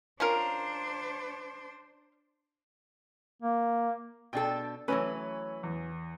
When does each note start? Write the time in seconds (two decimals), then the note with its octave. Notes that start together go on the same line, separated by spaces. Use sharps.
0.20 C#4 D4 F4 A#4 C5
3.42 A#3
4.33 B2 D4 A4 G5
4.88 E3 F#3 A3 C#4 B4 C#5
5.63 E2